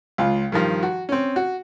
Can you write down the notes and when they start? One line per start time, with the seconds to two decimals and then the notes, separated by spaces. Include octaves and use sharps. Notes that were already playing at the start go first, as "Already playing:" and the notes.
0.18 C#2 F4
0.52 G2 D#3 F3
0.83 F#4
1.09 C4 C#4
1.36 F#4